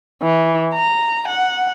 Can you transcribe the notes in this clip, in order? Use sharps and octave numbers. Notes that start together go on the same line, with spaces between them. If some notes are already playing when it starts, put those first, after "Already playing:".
E3
A#5
F#5